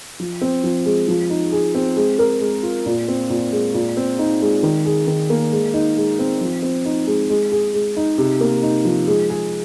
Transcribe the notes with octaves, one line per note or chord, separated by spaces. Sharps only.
F3
C4
F3
G#3
F3
D#4
G#4
C4
G#3
A#4
G#3
F4
A#2
C4
A#2
G#3
A#2
C4
D#4
G#3
D#3
G#4
D#3
A#3
G#3
D#4
G#3
C4
F3
C4
D#4
G#3
G#3
G#4
G#3
D#4
C3
A#3
D#4
F3
G#3
G#4